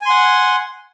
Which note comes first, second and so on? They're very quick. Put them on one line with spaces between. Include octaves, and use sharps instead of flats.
G#5 C6 F#5